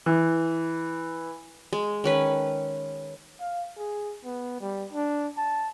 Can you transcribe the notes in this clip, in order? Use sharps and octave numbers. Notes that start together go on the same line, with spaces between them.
E3
G#3
D#3 C#4 B4
F5
G#4
B3
G3
D4
A5